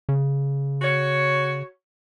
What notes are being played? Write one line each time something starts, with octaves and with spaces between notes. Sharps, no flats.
C#3
F#4 C#5